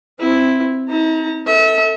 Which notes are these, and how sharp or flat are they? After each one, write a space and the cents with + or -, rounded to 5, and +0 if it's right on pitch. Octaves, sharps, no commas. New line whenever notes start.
C4 +0 E4 +0
D#4 +45 A#5 -30
A4 +20 E5 -35